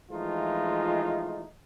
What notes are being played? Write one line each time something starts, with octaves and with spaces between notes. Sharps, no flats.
E3 F3 G#3 A3 D#4 F4